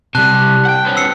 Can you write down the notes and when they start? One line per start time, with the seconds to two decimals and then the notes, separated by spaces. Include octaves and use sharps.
0.15 C3 G3 A5 F#6
0.65 F#5 G5
0.85 B3 C#4
0.97 E6 C7 C#7